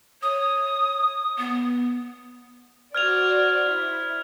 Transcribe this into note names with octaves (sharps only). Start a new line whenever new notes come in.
C#5 D#6
B3
F#4 C5 D5 F6 G#6 F7
E4